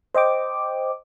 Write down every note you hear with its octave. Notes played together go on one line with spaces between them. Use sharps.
C5 D#5 G5 D6